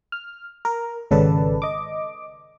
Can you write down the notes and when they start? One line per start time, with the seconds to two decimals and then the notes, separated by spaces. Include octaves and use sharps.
0.12 F6
0.65 A#4
1.11 G#1 C#3 A4 B4 D5 A5
1.62 D#5 D6